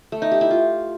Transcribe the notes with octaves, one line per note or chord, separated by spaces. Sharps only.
A3
D#4
G4
E4
F4